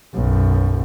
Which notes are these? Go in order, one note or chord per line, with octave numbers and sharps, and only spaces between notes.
B1 F#2